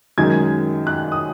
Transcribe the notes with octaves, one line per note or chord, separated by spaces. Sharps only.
F#2 D#3 G#3 G#6
F#6
D#6